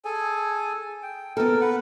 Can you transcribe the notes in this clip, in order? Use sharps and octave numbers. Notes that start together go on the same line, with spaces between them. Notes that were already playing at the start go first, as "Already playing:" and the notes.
G#4 A4 G#5
G5
B3 A4 A#4
B4 F#5